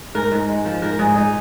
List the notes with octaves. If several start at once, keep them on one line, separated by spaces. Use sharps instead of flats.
G#2 A#4
G#2
G#3
F3
G#2 A#4
G#2 G#4
G#2 D#4